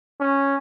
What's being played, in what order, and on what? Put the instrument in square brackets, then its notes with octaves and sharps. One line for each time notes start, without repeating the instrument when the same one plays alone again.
[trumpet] C#4